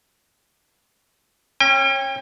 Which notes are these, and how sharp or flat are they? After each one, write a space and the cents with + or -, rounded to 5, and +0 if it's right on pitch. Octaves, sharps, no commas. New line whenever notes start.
C#4 -25 G5 +30